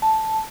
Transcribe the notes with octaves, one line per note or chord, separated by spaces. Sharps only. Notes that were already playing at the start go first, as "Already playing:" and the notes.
A5